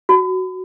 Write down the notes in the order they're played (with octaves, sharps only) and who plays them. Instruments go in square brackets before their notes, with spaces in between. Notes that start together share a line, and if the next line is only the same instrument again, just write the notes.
[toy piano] F#4